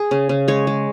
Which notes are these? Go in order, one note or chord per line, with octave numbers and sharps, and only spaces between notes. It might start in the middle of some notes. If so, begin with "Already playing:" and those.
Already playing: G#4
C#3
C#3
G#3 C#5
G#3